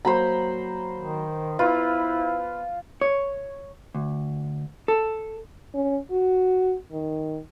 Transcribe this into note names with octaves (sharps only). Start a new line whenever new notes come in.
F#3 A#3 C5 A#5 B5
D#3
B3 E4 F4 B4
C#5
D2
A4
C#4
F#4
D#3